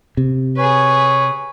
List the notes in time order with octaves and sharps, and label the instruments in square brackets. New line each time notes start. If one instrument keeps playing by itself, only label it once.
[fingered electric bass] C3
[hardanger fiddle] G#4 B4 [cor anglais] C#5